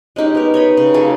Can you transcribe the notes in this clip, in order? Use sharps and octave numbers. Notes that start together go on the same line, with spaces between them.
G#3 C#4 D#4 G4
B3 A#4
C#5 D#5 B5
C#3
F#3 A#3 G#4 A4